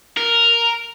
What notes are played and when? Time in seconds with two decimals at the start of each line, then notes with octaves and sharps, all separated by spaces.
0.17 A#4